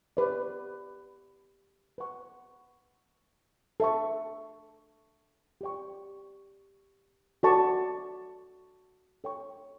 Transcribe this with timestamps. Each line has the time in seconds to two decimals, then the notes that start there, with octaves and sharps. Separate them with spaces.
0.17 G4 B4 D5
1.98 B4 F#5 C#6
3.80 A4 E5 A5 C#6
5.61 G4 D5 G5 C#6
7.43 F#4 A4 D5 A5 C#6
9.24 A4 C#5 G5 C#6